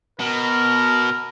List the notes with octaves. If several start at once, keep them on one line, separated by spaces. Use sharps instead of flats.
B2 A#4